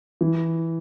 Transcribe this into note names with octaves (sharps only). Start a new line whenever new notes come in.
E3